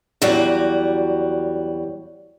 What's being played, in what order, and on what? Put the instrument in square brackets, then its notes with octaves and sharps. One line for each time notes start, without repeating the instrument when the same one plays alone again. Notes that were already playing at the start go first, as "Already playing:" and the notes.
[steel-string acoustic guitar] E2 F#3 G3 F#4